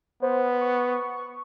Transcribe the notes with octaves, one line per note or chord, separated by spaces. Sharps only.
B3 C5
C#6